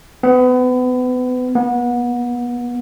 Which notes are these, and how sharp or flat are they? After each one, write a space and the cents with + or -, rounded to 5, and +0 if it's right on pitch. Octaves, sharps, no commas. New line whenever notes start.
B3 +30
B3 -30